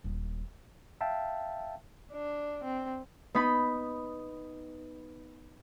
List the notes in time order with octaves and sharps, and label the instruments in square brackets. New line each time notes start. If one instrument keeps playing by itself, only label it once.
[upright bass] D#1
[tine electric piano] E5 F5 G5 A5
[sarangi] D4
C4
[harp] B3 D#4 B5